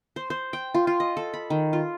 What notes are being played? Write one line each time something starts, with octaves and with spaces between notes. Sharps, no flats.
C5
C5
G5
F4
F4
D#5
A4
B5
D#3
F4